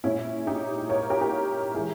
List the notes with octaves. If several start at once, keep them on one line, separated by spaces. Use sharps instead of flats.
A#2 G#3 C#4 E4
D#4 G4
A#4 C#5
G4 A#4
G4 A#4
E3 G#3 E4 G#4